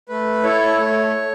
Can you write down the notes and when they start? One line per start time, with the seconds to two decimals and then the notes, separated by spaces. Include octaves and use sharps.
0.09 A3 B4
0.43 E4 A4 C#5
0.78 A3